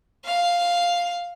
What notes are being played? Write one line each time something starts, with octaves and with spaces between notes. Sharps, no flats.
F5